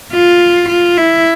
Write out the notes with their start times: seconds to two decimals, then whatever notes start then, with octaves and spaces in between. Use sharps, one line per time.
0.13 F4
0.69 F4
0.97 E4